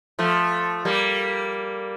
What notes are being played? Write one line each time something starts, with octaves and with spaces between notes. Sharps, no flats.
F3 A3
G3 A#3